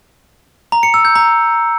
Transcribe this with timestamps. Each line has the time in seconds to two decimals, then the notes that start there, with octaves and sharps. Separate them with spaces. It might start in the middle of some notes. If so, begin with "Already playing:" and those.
0.72 A#5
0.83 C#7
0.94 E6
1.05 G6
1.15 A#5